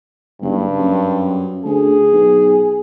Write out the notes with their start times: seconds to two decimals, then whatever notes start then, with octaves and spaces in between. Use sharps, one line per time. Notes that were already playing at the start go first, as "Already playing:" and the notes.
0.41 F#1 G2
0.79 F#2
1.65 D2 G#4
2.12 B1